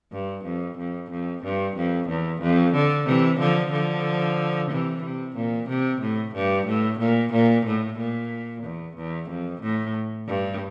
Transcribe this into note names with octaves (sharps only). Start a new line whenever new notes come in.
G2
F2
F2
F2
G2
F2
E2
F2
D3
C3 E3
D3 F3
D3 F3
C3 E3
C3
A#2
C3
A2
G2
A2
A#2
A#2
A2
A#2
E2
E2
F2
A2
G2